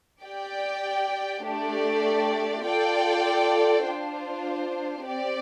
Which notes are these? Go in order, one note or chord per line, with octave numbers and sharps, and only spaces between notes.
G4 D5 G5
A3 D4 G4 D5
F4 A4 D5 G5
D4 F4 C5
C4 G4 D5